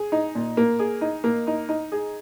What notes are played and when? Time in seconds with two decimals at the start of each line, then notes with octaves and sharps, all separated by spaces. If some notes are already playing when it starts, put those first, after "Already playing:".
Already playing: G#4
0.12 D#4
0.35 A#2
0.57 A#3
0.79 G#4
1.01 D#4
1.24 A#3
1.47 D#4
1.69 D#4
1.92 G#4